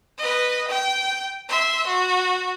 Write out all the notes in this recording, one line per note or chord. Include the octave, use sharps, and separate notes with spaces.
B4 D#5
G5
E5 C6
F#4